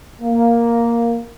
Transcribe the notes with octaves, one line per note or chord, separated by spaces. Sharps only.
A#3